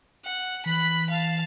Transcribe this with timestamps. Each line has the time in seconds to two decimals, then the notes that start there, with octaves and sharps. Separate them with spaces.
0.24 F#5
0.66 E3 B5 F#6
1.10 F5 A5